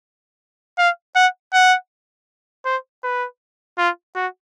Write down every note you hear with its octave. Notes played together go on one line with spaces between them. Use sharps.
F5
F#5
F#5
C5
B4
F4
F#4